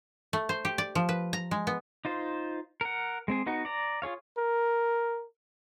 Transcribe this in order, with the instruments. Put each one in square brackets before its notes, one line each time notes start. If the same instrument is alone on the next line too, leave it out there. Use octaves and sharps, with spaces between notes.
[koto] A3
C5
G4
D5
F3
B4
A#5
G#3
B3
[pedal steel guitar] D#4 F4 C5
A#4 F#5
G#3 C4 G#4
B3 D#4 F#4
D5 A#5
F4 G#4 C#5 F5
[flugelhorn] A#4